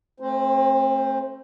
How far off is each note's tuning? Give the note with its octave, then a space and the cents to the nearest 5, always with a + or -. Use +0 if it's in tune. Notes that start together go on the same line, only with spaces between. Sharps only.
A3 +0 C4 +40 C5 +0